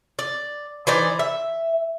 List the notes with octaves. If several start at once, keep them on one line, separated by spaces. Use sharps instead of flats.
D5
E3 D#4 C5 D5
E5